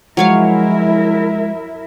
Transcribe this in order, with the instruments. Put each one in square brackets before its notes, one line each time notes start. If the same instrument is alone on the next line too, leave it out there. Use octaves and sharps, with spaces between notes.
[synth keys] F3 [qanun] F#3 C#5 F5 [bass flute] G#3 [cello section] E4 A#4 E5